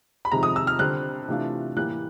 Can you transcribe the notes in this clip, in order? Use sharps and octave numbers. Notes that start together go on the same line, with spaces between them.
B5
F2 C3 D#3 G#3 A#5
D#6
E6
F6
D3 G3 C4 F#6
C3 E3 A3 D4 F4
A2 E3 G3 A#3 F#6